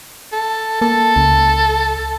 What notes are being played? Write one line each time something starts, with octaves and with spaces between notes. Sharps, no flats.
A4
A#3 A4
C#2